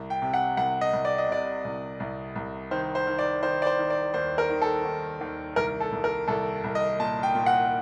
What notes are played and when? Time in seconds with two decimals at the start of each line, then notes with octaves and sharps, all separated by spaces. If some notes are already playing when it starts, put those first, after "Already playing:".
Already playing: C2
0.10 G5
0.22 C3
0.34 F#5
0.57 C2 F#5
0.81 D#5
0.93 C2
1.05 D5
1.18 D#5
1.28 C3 D5
1.65 C2
2.00 C2
2.36 C2
2.71 D#3 C5
2.95 C5
3.07 D#3
3.19 D5
3.43 D#3 C5
3.62 D5
3.66 C5
3.79 D#3
3.90 D5
4.14 D#2 C5
4.38 A#4
4.50 D#3
4.62 A4
4.85 D#2
5.21 D#2
5.56 C2 A#4
5.80 A4
5.92 C2
6.04 A#4
6.28 C2 A4
6.64 C2
6.75 D#5
6.99 A#2 A5
7.23 G5
7.35 A#2
7.46 F#5